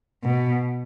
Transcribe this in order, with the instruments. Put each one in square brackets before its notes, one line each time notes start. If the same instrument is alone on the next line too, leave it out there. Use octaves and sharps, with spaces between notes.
[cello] B2